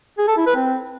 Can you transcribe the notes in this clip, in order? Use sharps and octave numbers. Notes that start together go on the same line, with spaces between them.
G#4
A4
E4
B4
C4